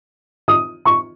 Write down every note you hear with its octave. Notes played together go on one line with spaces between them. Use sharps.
D#6
C#6